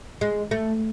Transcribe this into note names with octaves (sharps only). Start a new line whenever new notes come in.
G#3
A3